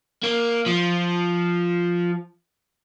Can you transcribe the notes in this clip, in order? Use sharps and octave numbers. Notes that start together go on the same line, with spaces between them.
A#3
F3